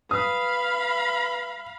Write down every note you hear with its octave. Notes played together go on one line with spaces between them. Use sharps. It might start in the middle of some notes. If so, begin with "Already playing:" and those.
B4 F5 B5 D#6